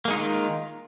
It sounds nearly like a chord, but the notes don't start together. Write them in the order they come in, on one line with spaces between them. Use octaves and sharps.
A#3 G#3 D#4 F4 D#3